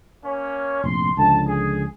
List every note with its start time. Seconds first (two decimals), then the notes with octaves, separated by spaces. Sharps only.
0.24 A#3 C#4 C#5
0.84 F1 A#1 C6
1.17 C#2 D3 F3 A5
1.47 G#4